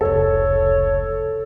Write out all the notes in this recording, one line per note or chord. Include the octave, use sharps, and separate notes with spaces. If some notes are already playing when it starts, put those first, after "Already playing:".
F1 C#2 A4 C#5